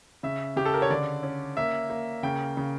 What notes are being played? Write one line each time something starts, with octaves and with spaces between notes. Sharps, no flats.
C#3 E5
C#3 G4
A4
A#4
C#5
D3 D5
C#4
A#3 E5
A#3
C#3 G5
C#3